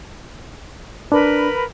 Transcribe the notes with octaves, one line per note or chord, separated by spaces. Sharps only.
D4 A#4 B4 B5